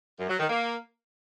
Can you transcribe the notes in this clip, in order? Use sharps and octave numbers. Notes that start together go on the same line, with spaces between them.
F#2
F#3
D#3
A#3